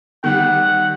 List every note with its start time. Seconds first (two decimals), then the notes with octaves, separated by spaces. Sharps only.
0.24 D#3 G3 G4 F#5